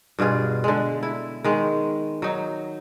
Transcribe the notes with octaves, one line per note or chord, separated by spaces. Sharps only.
G2 B2 F4 G#4
D3 G#3
E4
D#3 G#3
F#3 D#4